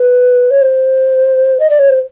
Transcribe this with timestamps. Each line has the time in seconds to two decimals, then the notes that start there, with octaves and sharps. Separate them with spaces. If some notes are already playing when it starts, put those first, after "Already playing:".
Already playing: B4
0.51 C#5
0.61 C5
1.60 D#5
1.70 D5
1.79 C#5
1.89 C5